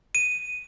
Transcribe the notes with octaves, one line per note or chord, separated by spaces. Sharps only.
D#7